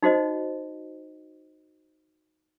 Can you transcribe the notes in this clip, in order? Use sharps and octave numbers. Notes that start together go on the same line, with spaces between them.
D#4 F#4 C5 D#5